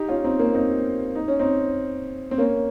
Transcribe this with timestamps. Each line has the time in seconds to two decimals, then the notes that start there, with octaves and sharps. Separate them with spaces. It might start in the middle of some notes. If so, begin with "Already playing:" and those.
Already playing: D#4 G4
0.09 C#4 F4
0.24 C4 D#4
0.39 A#3 C#4
0.54 C4 D#4
1.15 D#4
1.28 C#4
1.39 C4 D#4
2.31 C4
2.38 A#3 C#4